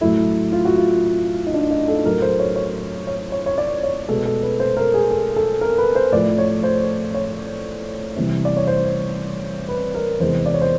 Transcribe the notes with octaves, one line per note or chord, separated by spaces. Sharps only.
A2 F#3 A3 E4
F4
F#4
F4
D#4
D4
D#4
A4
A2 F#3 A3 A#4
C5
C#5
C#5
C#5
C#5
C#5
D5
C#5
B2 G#3 A4
A4
B4
C5
A#4
G#4
A4
A4
A#4
B4
C5
A2 F3 A3 D5
C#5
C5
C#5
C3 E3 G3
D5
C#5
C5
B4
A#4
E2 C3 E3 G#3 C5
D5
C#5
C5